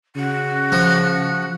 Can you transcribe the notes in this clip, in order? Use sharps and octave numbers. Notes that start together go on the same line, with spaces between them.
C#3 F#4
F3